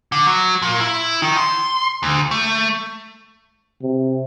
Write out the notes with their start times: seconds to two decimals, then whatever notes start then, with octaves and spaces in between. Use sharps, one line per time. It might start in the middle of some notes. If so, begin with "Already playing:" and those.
0.12 D3
0.26 F#3
0.62 A#2
0.81 E4
1.22 D#3
1.37 C6
2.03 D2
2.31 A3
3.82 C3